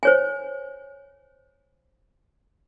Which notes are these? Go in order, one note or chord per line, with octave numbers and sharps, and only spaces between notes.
C5 C#5 G#5